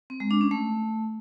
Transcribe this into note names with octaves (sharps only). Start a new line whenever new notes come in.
C4
G#3
D4
C#4
A3